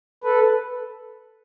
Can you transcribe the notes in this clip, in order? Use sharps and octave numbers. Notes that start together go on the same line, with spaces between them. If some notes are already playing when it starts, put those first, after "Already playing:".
A4 B4